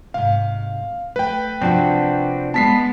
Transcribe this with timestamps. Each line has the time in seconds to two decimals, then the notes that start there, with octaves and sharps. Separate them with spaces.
0.14 G#2 C3 F5
1.16 A3 B4 G5
1.62 C3 F3 C4 D4 F#4
2.54 G#3 B3 A5 B6 C7